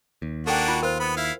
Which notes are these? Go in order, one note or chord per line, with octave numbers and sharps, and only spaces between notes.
D#2
A#3 D4 F#4 A4 G5 G#5
F4
F4 A#4 C5
B3 B5
E4 F5